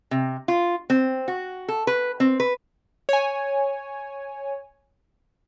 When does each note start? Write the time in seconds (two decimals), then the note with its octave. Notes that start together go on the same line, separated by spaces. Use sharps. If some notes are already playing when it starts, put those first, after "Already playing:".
0.11 C3
0.48 F4
0.90 C4
1.28 F#4
1.68 A4
1.87 B4
2.20 C4
2.40 B4
3.09 C#5 G#5